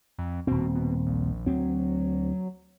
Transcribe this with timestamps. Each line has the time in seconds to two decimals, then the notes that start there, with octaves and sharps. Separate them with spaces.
0.18 F2
0.47 D#1 B2 C4
0.75 B2
1.06 A#1
1.46 D2 F#3 C4